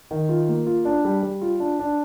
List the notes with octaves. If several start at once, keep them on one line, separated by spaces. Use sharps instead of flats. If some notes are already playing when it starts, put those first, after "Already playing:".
D#3
F4
A#3
F4
D4
G3
G3
F4
D4
D4